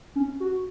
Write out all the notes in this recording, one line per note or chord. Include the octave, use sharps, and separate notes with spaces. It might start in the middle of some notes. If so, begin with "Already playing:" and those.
C#4
F#4